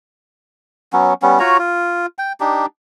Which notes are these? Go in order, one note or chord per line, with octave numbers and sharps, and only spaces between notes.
F#3 B3 C#4
G3 B3 C#4
F4 F#4 C#5 A#5
F4
G5
D4 D#4 G4